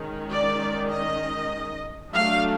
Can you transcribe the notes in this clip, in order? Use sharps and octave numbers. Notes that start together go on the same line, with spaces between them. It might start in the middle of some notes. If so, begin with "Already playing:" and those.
Already playing: D#3 G#3 C#4
D5
D#5
F#3 A3 D4 F5